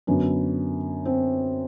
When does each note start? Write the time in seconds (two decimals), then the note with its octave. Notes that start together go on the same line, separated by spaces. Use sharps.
0.07 F#2 D3 B3
1.05 C4